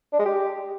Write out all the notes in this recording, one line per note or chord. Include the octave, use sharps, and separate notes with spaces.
D4
G#3
G4